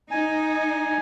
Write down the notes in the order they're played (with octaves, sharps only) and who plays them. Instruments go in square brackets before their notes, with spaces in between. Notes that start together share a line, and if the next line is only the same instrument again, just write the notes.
[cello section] D#4 [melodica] G#5